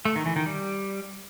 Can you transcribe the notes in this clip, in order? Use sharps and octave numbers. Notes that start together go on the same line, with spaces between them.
A3
D#3
E3
D#3
G3